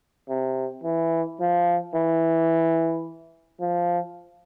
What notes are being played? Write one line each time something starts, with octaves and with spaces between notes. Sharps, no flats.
C3
E3
F3
E3
F3